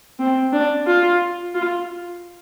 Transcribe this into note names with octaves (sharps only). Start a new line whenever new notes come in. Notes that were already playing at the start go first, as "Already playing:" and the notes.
C4
D4
F4
F4